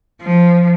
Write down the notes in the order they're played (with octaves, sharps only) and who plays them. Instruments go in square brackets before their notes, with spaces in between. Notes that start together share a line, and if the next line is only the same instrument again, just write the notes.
[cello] F3